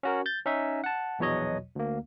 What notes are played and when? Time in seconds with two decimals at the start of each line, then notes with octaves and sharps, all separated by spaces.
0.03 C#4 F#4 A#4
0.26 G6 A6
0.46 C#4 D#4 E5
0.84 F#5 A5
1.19 A#1 E2 B2 F#3 C#5 D#5
1.75 D2 A#3